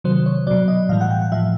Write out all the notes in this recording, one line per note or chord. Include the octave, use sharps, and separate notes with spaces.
C3 D#3 F#3 C5
C#5
B2 F#3 D5
D#5
A2 E3 G3 F5
F#5
G5
F#5
A2 F3 E5